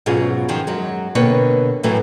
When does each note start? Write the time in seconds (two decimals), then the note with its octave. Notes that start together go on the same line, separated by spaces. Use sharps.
0.06 G#2 B2 F#3 C#4 F4 G#4
0.48 F#2 D#3 F3 F#3
0.67 F#2 F#3 G#3
1.15 B2 D3 A#3 C4 B4 C#5
1.83 F#2 A2 E3 F#3 A3